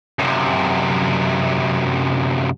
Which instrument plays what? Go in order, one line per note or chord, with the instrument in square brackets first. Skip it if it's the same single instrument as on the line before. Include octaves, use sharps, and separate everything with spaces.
[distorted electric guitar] F#2 C3